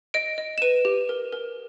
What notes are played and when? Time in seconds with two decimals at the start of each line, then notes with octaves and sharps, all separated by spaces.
0.14 D#5 D7
0.38 D#5
0.58 E7
0.62 B4 D#7
0.85 G4
1.09 A#4
1.32 A#4